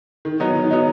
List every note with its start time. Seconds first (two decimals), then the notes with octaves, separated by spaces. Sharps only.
0.25 D#3
0.40 F#3 B3 D#4
0.56 D#3
0.71 F#3 B3 D#4